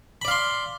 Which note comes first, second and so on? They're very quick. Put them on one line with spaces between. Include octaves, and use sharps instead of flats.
B5 D5 F5 C6